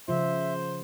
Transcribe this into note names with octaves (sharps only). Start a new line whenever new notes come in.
C#3 F3 F4 C5 E5